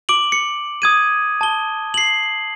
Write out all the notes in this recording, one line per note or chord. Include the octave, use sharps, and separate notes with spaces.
D6 D7 F#7
C#7
D#6 G#6 D#7
A5 G7
C7 F#7